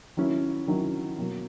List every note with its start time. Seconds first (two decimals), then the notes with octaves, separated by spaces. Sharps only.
0.17 D#3 F#3 C#4 E4
0.68 D#3 F#3 C#4 E4
1.18 B2 F#3 A#3